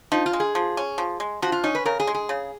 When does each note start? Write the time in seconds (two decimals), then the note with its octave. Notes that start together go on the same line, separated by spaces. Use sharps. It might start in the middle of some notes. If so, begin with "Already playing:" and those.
0.12 F3 D#4
0.26 F4
0.33 G#3
0.40 G#4
0.55 F3
0.77 C#4
0.98 F3
1.20 G#3
1.42 F3 F#4
1.52 F4
1.64 C#4 D#4
1.75 B4
1.85 C#3 A#4
2.00 G#4
2.07 G#3
2.15 G#4
2.29 C#3